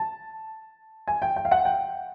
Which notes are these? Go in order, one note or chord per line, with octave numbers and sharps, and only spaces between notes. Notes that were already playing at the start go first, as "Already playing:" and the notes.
Already playing: A5
G#5
G5
G5
F5
F#5
G5